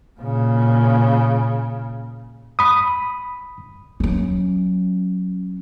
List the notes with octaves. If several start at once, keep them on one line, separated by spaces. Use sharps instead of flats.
A#2 C#3
B5 D#6
F#3 C#4